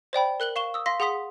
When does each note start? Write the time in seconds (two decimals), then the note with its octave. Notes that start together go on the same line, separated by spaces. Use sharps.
0.13 C5 D5 G5 B5
0.40 A#4 F#6 F#7 G7
0.56 F5 C#6 E7 G7
0.74 D#6 E6
0.86 F5 C6 A#6 B6
1.00 G#4 F#5 C6 D#6 B6